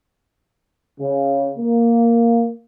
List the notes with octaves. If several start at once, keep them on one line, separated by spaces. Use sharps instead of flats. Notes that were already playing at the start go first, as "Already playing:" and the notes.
C#3
A#3